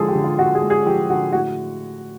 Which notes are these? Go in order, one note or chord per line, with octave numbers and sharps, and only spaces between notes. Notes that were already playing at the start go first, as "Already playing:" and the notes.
Already playing: D3 F3 G#3 G#4 A4
G4
D3
F4
D3 F#4
G#4
G#3
G#4
F3 G4
D3 F#4
A2 F#4